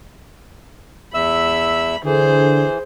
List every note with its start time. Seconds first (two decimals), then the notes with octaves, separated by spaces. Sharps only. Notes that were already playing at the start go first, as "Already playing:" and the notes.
1.14 E2 E5 B5 E6
2.04 D3 E3 G#4 C5